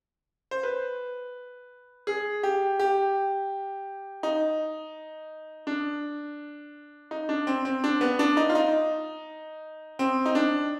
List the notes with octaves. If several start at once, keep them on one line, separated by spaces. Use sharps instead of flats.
C5
B4
G#4
G4
G4
D#4
D4
D#4
D4
C4
C4
D4
B3
D4
D#4
F4
D#4
C4
D#4
D4